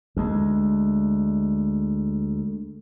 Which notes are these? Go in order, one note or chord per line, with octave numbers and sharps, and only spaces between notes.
D2 G#3